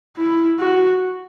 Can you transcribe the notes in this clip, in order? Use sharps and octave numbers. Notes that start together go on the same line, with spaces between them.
E4
F#4